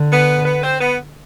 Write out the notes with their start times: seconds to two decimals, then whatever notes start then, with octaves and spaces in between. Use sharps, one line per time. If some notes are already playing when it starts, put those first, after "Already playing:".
Already playing: D3
0.12 B3 B4
0.45 B3 B4
0.63 C4 C5
0.80 B3 B4